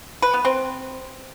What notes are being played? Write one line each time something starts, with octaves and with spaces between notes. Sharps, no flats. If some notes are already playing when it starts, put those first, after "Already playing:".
B4
B3
C4